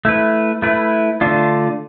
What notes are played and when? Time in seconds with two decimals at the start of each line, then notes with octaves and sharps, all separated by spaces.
0.05 A3 E4 B4
0.62 A3 E4 B4
1.21 D3 A3 D4 F4